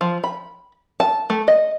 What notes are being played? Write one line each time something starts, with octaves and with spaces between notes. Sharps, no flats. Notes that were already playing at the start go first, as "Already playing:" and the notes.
F3
B5
A5
A3
D#5